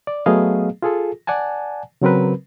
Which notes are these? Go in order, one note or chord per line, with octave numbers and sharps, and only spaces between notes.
D5
F#3 A3 B3 G#4 D#5 F5
F4 G#4 A4
D5 F#5 G#5 A5
C#3 F#3 C4 A#4 B4